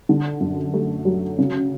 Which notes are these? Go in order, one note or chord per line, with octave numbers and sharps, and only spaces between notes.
D3
F#2
A3
F#3
C#3